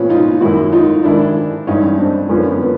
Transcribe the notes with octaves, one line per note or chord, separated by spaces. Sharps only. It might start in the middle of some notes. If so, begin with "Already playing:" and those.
Already playing: A#2 F3 B3 C#4
D#4 F4
F#2 D#3 E4 F#4
D#4 F4
G#2 D#3 D4 E4
G2 E3 C#4 D#4
C4 D4
F#2 D3 F3 B3 C#4
B3